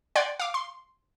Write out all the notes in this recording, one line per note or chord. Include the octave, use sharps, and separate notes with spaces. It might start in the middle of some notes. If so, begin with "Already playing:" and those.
D5 F#5 G5 C6 G#6
F5 D6
C6